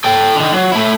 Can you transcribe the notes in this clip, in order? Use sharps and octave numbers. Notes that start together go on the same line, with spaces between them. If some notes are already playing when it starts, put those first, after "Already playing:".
A4 G5
D3 D#3
F#3
A3 E4